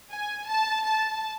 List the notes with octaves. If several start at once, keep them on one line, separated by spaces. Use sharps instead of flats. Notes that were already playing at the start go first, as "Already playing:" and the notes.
G#5
A5
A5